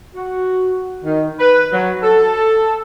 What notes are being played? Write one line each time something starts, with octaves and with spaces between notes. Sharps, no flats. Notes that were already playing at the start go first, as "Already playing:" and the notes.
F#4
D#3
B4
F#3
A4